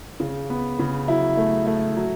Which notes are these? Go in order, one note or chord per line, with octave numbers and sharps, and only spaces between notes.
C#3
B3
C#3
F#3 E4
A3
A3
F#3